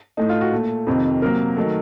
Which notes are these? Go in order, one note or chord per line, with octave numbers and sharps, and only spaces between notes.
A2 A3 D#4
F4
F#4
A#2 A3
F2 C3 D#3
C3 F#3 A#3 A#4
D#3 F#3 A3